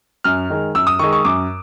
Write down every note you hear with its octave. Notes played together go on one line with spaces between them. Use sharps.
F#2 F6
D#3 G#3
F#2 E6
D#6
D#3 G#3 C#6
C#6
F#2 D6